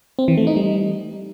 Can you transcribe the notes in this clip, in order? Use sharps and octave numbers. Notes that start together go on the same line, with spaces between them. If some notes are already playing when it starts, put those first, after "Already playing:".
C4
E3
A3
D#4
G3